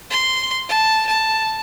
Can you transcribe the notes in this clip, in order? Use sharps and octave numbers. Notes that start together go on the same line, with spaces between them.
C6
A5
A5